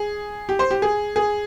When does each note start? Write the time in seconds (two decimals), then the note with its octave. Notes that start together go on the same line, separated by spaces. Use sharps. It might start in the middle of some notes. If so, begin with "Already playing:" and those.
Already playing: G#4
0.49 G4
0.59 C5
0.71 G4
0.82 G#4
1.16 G#4